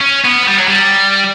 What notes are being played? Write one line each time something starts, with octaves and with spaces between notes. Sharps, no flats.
C#4
B3
G3
F#3
G3